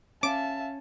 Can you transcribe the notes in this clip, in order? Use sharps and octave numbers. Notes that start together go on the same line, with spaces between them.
C#4 E5 F5 A5 D6